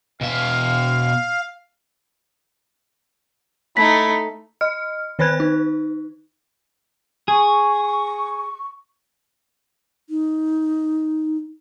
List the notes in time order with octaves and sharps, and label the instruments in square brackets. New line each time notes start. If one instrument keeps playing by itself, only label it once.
[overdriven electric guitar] B2 E5 [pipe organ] F5
[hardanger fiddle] A3 D#4 [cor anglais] E4 [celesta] B6
[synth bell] D#5 F6
D#3 B4 C5 B5 F#6 G#6
D#4
[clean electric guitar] G#4 [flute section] C#6
[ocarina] D#4